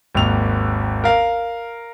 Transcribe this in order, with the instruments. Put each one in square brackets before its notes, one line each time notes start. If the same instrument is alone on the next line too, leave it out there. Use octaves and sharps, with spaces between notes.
[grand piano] G#1 D#2 F7
A#4 F5